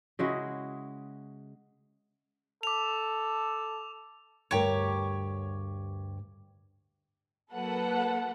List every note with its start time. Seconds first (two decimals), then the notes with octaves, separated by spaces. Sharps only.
0.19 C#3 G#3 E4 F#4
2.63 A4 D6 F7
4.51 D2 G2 G4 A#4 C#5
7.52 F#3 A#3 A4 B4 F#5